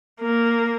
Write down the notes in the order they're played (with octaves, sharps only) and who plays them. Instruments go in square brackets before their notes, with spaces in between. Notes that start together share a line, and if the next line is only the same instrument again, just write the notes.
[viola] A#3